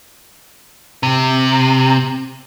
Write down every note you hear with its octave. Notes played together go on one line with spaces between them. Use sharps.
C3